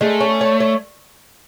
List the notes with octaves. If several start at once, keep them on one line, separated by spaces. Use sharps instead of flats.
G#3 A3
C#4
C#5
C#5